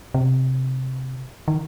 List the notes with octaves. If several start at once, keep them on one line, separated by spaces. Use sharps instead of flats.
C3
D#3